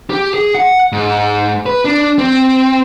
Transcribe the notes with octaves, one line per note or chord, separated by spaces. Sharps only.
G4
G#4
F#5
G#2
B4
D4
C4